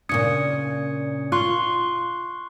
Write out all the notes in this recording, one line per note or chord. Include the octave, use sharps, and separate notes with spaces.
A#2 C#3 D4 D#6 G#6 C#7
F4 C6 C#6 F#6